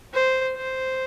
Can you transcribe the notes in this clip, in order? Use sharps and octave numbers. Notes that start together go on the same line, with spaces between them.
C5
C5